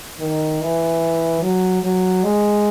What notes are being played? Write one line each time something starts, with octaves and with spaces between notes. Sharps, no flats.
D#3
E3
F#3
F#3
G#3